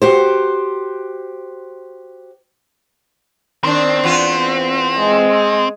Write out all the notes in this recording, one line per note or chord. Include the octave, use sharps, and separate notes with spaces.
F#4 G4 C5
D#3 C4 D4
E2 B3 F4
G#3